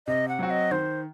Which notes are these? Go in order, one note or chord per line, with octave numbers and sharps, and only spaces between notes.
C3 D#5
F#5
F#3 C4 F#4
D#5
D#3 C5